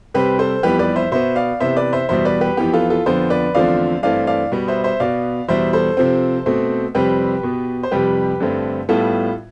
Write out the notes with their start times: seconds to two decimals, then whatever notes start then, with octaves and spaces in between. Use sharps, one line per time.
0.14 C3 G3 C4 G4 B4
0.39 A4 C5
0.63 F2 E3 G3 B3 G4 B4
0.79 B4 D5
0.96 C5 E5
1.12 B2 B3 C5 E5
1.36 D5 F5
1.60 C3 E3 B3 C5 E5
1.77 B4 D5
1.93 C5 E5
2.09 E2 B2 G3 C5 E5
2.25 B4 D5
2.41 G4 B4
2.57 F2 E3 B3 G4
2.74 F4 A4
2.90 F4 A4
3.06 F2 D3 F3 B3 A4 C5
3.30 B4 D5
3.54 E2 D3 F3 A3 C4 D5 F5
4.03 G2 E3 A3 C4 D5 F5
4.27 D5 F5
4.52 B2 G3 B3
4.68 C5 E5
4.84 C5 E5
5.00 B2 B3 D5 F5
5.49 E2 B2 G3 C5 E5
5.73 A4 C5
5.97 C3 F3 C4
6.46 B2 A3 C4
6.95 F2 C3 G3 C4 G4 B4
7.43 B2 B3
7.83 C5
7.91 F2 C3 G3 G4 B4
8.40 G2 D3 A3 C4
8.89 A2 G3 B3 F4 A4